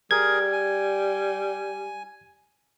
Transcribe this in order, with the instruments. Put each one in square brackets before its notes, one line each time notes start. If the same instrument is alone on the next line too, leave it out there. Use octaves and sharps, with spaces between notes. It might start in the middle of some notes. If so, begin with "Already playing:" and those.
[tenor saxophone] G3 [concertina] G#4 A#4 [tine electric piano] G#6
[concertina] G#5